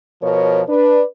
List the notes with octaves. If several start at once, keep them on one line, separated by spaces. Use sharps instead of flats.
B2 F3 A#4 C#5
D4 B4